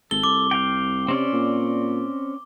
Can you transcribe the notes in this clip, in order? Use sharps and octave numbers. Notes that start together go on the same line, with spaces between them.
G#1 A4 G7
C2 D6
F5 G5
C3 C4 C#4 D5
A#2